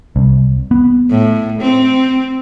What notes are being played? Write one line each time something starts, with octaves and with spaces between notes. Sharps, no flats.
C2
B3
A2
C4